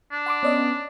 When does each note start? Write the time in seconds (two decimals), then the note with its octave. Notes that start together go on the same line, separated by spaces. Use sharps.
0.12 D4
0.26 F#5 C6 D6
0.43 B3 C#4 D5 D#5